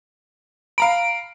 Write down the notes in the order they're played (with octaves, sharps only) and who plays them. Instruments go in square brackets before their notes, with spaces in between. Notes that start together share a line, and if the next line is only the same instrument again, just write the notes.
[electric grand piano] F5 A#5 B5 [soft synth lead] D7